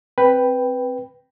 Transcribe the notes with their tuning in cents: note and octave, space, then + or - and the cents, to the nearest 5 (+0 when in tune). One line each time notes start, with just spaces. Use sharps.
C4 +0 B4 +0 G5 +0